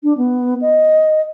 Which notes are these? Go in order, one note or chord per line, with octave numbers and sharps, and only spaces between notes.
D4
B3
D#5